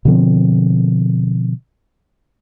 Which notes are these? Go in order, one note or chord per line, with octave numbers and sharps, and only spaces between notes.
B2 D3 F3 C4